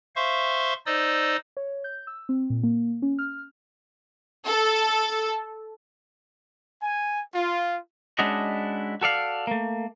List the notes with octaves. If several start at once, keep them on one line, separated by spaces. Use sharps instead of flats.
C5 E5 F5 C6 C#6
D#4 C5 D5 D#5 D#6 E6
C#5
G6
E6
C4
A#2
A#3
C#4
F6
A4
G#5
F4
G#3 C#4 D4 E4 F#4 D#5
F#4 A4 D5 F5
A3 A#3